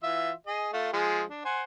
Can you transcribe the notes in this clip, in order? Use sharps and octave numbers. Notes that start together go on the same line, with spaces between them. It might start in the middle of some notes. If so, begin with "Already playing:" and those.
E3 F4 E5
G#4 D#5
A3 F4
F3 G#3 G#4
D4
C5 F#5 G#5